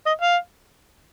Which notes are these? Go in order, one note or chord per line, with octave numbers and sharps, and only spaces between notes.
D#5
F5